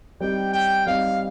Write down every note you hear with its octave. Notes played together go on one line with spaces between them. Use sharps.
G3 C4 D#4 G4 G5
G5
G3 C4 D#4 G4 F5